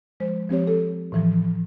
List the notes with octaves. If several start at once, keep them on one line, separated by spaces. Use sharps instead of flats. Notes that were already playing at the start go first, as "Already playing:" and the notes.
F3 G#3 C5
F3 C4 G4 C#5
A4
A2 E3 F3